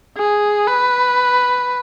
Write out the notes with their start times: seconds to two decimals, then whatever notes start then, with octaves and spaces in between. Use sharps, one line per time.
0.17 G#4
0.67 B4